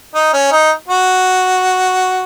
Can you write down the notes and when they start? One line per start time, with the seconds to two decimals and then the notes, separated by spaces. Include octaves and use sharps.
0.15 D#4
0.33 C#4
0.52 D#4
0.88 F#4